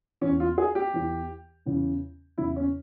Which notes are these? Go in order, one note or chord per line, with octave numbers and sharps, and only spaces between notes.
E2 E3 C#4
F4
G#4
G4
E2 E3
E2 C#3 E3
E2 C#3 E3 E4
C#4